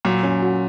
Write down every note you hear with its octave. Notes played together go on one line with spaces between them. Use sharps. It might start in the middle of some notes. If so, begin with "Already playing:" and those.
A#2 F#3
C#4
F#4